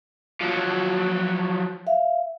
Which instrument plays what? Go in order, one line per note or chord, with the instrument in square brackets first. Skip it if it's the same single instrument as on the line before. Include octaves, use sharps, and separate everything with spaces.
[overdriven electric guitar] F3 F#3
[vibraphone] E5 F5